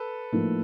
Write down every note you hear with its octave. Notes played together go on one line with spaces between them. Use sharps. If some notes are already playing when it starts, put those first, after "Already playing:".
Already playing: A4 B4
A2 F3 A#3 D#4